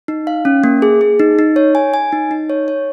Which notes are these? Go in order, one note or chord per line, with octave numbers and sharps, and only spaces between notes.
D#4
F5
C#4
A#3
G#4
G#4
D#4
D#4
C#5
G#5
G#5
D#4
D#4
C#5
C#5